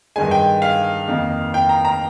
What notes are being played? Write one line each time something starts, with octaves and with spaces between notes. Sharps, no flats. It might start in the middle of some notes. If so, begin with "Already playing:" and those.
G2 D#3 G#3 G#5
G5
F5
F2 D#3 A#3
G5
A#5
A#5